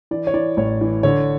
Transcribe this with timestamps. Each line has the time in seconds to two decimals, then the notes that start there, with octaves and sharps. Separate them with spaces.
0.11 E3 D5
0.27 C#5
0.34 E3 D5
0.57 A1 C#5
0.81 E3
1.03 D3 C#5